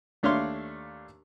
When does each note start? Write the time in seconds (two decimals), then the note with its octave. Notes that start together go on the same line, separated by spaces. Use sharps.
0.23 D#2 A3 D4 C#5 F5 C6